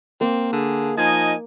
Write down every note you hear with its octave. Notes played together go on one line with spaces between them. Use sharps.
A#3 C4
D3 G#4
F3 D#4 D#5 G#5